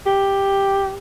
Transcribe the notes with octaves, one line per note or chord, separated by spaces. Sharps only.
G4